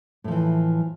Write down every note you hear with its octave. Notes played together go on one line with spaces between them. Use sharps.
A2 E3 F3